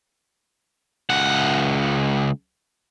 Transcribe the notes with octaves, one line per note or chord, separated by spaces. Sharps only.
C#2 F#5